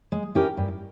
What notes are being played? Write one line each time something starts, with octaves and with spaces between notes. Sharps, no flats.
G#3
C#4 E4 G4 A#4
G2